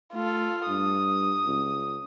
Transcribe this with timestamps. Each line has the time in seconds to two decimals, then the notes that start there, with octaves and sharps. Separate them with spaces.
0.14 A3 F4 A4
0.68 G2 D#6
1.46 C#2